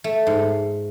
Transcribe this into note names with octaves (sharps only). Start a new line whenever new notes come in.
A3
G#2